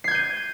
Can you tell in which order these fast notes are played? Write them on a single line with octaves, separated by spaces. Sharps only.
C7 G#6 G6 D#7